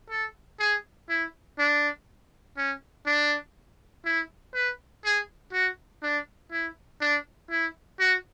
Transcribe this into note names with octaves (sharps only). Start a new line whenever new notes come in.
A4
G#4
E4
D4
C#4
D4
E4
B4
G#4
F#4
D4
E4
D4
E4
F#4